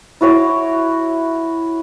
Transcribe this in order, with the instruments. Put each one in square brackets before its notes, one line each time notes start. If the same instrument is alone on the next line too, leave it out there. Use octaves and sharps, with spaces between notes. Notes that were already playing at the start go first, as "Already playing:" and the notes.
[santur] E4 F#4 C#5 D6